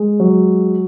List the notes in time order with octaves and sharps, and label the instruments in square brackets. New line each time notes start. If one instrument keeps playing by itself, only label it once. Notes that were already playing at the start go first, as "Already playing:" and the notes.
Already playing: [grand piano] G#3
F#3